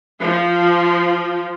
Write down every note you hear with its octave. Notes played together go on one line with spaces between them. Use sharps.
F3